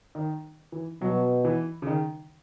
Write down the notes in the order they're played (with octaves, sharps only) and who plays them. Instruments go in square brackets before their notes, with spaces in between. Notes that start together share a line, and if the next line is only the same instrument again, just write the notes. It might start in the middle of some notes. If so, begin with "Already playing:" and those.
[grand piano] D#3
E3
[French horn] B2 [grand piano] F#3
[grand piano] E3
C#3
D#3